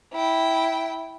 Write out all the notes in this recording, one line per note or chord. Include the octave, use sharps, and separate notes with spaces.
E4 G5